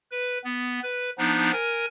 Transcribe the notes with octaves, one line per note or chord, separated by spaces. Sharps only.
B4
B3
B4
F3 B3 D4 D#4
A#4 G#5